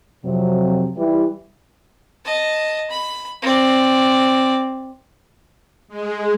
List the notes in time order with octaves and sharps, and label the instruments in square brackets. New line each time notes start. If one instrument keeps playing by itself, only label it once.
[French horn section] F2 C3 F#3
E3 G3
[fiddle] D#5 A5
B5
C4 D5
[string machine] G#3